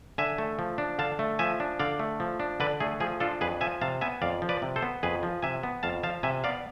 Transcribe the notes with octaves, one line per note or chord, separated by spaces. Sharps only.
D3 E5 G#5
A3
F3
D4
D3 F5 A5
A3
F3 E5 G#5
D4
D3 D5 F5
A3
F3
D4
D3 B4 D5
A3 G#4
F3 G#4
D4 F4 A4
F2 G#4 B4
F3 E5 G#5
C3 F5 A5
B3 E5 G#5
F2 D5 F5
F3
B4 D5
C3
A4 C5
B3
F2 G#4 B4
F3
C3 E5 G#5
B3
F2 F5 A5
F3 F5 A5
C3 E5 G#5
B3 D5 F5